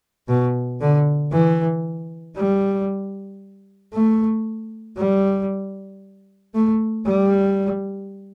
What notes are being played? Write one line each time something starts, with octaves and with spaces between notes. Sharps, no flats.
B2
D3
E3
G3
A3
G3
A3
G3